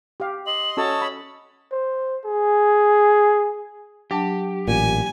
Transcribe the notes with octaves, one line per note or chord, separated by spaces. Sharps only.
G4 F5
D#5 C6 F#7
C#4 F#4 A4 C#5 D#5 A5 E6
B5
C5
G#4
F#3 D4 G4 A5
A1 A#2 G#5